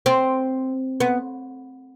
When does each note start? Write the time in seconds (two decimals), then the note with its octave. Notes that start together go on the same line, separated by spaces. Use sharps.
0.06 C4
1.00 B3